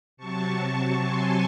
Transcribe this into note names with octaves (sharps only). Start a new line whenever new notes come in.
C3 F#3 A5 C#6
G#5 C6